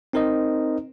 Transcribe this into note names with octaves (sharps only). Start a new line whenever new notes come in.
C4 D#4 A#4 C5 D#5